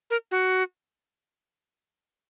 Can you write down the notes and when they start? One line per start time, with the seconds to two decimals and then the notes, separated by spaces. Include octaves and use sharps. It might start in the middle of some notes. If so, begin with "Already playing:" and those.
0.10 A#4
0.31 F#4